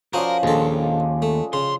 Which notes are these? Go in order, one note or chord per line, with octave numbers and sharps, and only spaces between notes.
F3 C#4 F#4 A#4 C5 D5 D#5
A#1 D#2 G#3 A4
A3
C#3 C6